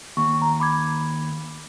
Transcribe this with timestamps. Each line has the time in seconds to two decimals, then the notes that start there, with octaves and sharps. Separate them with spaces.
0.17 D#2 C#6
0.42 A#5
0.60 B5 D6 G#6